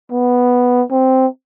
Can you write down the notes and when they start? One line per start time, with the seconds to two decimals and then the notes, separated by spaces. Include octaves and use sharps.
0.12 B3
0.91 C4